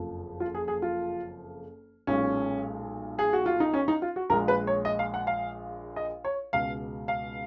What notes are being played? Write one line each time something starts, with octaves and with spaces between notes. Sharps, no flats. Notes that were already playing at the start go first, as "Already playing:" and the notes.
Already playing: F#1 F2 F3
F4
G#4
G#4
F4
B1 A#2 G#3 C#4
G#4
F#4
F4
D#4
C#4
D#4
F4
F#4
A#1 A#2 G#3 A#4
B4
C#5
D#5
F5
F#5
F5
D#5
C#5
C#2 B2 G#3 F5
F5